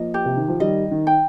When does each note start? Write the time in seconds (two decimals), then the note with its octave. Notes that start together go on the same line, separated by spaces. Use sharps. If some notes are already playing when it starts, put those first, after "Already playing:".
Already playing: F3 A#3 D#5
0.14 G4
0.25 C3
0.37 D#3
0.48 F3
0.60 D#3 G3 D#5
0.91 D#3
1.07 G5